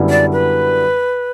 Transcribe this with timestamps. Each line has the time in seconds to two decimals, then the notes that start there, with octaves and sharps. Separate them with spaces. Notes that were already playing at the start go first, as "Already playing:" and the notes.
Already playing: F#2 D3 G3 B3 E4
0.10 D5
0.32 B4